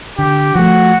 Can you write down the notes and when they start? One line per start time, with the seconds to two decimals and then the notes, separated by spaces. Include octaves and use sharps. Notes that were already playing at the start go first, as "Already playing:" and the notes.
0.18 D3 G4
0.54 F3 A3 F#4